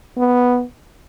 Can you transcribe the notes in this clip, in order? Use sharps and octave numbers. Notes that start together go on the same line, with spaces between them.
B3